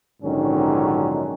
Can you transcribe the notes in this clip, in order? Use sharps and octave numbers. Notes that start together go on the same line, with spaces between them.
A#1 G#2 D3 D#3 F#3 C#4